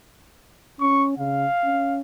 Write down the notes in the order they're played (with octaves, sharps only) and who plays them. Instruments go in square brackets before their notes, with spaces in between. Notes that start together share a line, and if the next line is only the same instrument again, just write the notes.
[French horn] C#4 [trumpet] C#6
[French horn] C#3 [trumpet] F5
[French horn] C#4